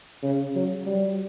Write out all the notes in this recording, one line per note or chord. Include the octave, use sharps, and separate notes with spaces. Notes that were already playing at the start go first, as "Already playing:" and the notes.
C#3
F#3
G3